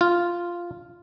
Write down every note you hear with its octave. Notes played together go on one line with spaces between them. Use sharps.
F4